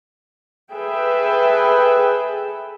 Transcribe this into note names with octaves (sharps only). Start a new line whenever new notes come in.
G#4 A4 B4 E5 G5